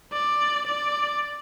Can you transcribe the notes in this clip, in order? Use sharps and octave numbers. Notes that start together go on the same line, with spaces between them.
D5
D5